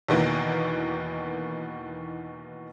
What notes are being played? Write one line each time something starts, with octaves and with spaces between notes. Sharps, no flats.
E2 B2 D#3 E3 A#3